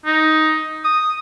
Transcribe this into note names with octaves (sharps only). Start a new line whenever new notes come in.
D#4
D#6